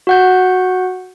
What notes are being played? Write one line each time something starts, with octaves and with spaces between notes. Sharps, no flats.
F#4 F#5 G6